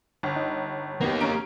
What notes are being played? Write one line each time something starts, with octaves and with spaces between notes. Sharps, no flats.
G1
D#4
D#3 A#3 B3 G4
C#4 A#5 D7